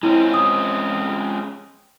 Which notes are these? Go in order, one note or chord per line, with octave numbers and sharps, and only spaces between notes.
G#3 C4 C#4 E4
D#6